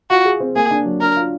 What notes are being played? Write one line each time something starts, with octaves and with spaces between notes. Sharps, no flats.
F4 F#4
G#4
C4
A#3 G#4
D4
F#3
D4 A#4
F4